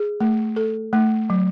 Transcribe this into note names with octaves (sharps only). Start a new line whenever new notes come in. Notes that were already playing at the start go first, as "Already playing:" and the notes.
Already playing: G#4
A3
A4
A3
F#3